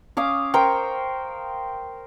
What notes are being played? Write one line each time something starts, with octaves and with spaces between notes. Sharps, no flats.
C#4 F5 D6 D#6
A#4 C5 G5 C#6